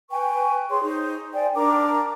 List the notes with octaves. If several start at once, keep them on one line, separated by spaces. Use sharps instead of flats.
B4 G5 G#5 C#6
G#4 C#5 C6
D#4 C5
C5 D5 G5 G#5
D4 A#4 A#5 D6